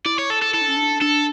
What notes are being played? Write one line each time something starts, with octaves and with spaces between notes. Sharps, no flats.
E4 D5
C#5
A4
A4
E4 A4
D4
C#4
D4
D4 A4